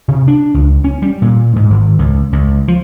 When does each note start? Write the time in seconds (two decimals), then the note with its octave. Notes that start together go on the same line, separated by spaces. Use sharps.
0.08 C3
0.28 D4
0.54 C#2
0.84 C#4
1.02 G3
1.22 A#2
1.56 G#2
1.70 G#1
1.99 C#2
2.33 C#2
2.68 F3